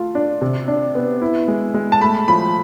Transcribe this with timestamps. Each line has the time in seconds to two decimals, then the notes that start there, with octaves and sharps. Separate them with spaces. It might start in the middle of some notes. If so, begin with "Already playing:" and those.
Already playing: A3 F4
0.15 D4
0.41 C3
0.68 D4
0.95 B3
1.22 E4
1.48 G#3
1.74 G#3
1.92 A5
2.01 A3 B5
2.28 F3 B5